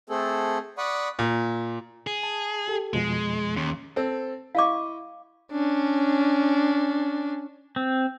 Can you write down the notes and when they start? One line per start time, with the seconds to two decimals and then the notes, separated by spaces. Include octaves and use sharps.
0.10 A3 C4 G#4 A4
0.78 D5 F#5 B5 C#6 D#6
1.19 A#2
2.07 G#4
2.23 A5
2.68 G4 A4
2.93 F2 B2 F3 G#3
3.57 D#2 C#4 C6
3.96 C4 A4
4.55 E4 D#5 F5 C#6 D6
5.52 C#4 D4
7.76 C4